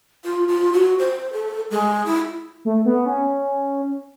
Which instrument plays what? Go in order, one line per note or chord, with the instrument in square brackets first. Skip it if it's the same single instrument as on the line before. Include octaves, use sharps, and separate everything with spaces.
[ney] F4
F4
F#4
C5
A4
G#3
E4
[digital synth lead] A3
B3
C#4